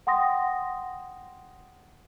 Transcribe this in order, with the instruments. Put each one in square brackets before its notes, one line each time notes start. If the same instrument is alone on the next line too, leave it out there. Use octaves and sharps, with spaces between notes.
[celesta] F#5 G5 C6 D#6 A#6